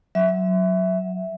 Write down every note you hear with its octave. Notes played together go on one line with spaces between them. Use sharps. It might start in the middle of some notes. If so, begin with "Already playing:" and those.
F#3 E5